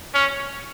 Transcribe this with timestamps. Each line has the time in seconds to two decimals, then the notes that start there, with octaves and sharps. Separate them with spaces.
0.14 C#4